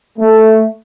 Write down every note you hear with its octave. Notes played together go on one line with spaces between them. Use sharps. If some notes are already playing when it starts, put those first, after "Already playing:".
A3